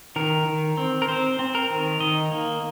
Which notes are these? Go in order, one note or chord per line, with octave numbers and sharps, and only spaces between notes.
D#3 A#4
D#3
C4
A#4
C4 C5
C4
A#4
D#3
D#3 D#5
A#3